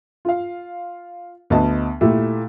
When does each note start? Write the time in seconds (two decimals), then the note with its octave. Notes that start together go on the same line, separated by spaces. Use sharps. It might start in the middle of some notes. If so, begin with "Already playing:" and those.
0.25 F4 F5
1.50 D2 B3 D#5 A5
2.01 A#2 A3 E4 G4